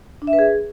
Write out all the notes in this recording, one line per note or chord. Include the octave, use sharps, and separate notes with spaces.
D4
E5
B4
G#4